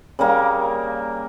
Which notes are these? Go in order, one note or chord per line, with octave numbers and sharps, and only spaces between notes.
C#3 G3 A#3 A#5